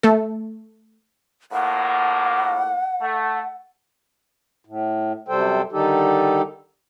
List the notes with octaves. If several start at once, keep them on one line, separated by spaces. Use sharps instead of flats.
A3 A4
A#1 A2 A#3 F#5
A3
A2
F#2 C3 G3 A4 C5 G5
D3 D#3 G3 D#4 G4 A4